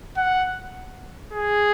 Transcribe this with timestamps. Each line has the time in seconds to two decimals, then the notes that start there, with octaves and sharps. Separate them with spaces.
0.17 F#5
1.33 G#4